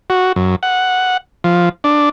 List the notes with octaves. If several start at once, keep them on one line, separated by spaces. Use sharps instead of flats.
F#4
F#2
F#5
F3
D4